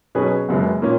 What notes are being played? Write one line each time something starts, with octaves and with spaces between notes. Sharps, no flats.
B2 F#3 C#4 G#4 B4
F#1 F#2 C#3 G#3 B3
A#2 A#3 C#4